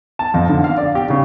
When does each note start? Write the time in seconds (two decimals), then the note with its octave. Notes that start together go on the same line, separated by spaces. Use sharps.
0.19 A5
0.34 F2
0.49 D3
0.64 F5
0.78 D5
0.95 G4
1.10 C#3